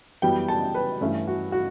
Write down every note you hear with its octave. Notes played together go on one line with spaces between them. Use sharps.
F#2 E3 G3 B3 G5
A5
B4
G2 E3 A3 C#4
F#4
F#4